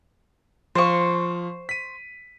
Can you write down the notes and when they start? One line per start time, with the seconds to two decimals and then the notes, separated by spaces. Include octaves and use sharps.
0.75 F3 C5 F5 C#6
1.69 B6 D#7